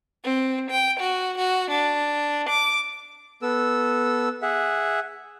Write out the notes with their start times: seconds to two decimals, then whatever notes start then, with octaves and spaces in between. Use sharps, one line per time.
0.23 C4
0.70 G5
1.01 F#4
1.38 F#4
1.70 D4
2.50 D6
3.42 B3 A4 E6
4.42 G#4 E5 F#5